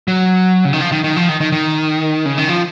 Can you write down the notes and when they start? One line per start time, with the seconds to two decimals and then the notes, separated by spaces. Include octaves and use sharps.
0.08 F#3
0.65 C#3
0.73 D#3
0.81 F3
0.92 D#3
1.04 D#3
1.16 F3
1.29 D#3
1.41 D#3
1.52 D#3
2.26 C#3
2.38 D#3
2.49 F3